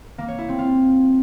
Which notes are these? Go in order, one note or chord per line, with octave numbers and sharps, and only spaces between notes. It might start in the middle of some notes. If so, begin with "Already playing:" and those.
A#3
C#5
E4
C4
F4